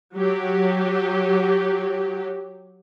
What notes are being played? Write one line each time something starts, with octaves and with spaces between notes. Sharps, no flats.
F#3 G4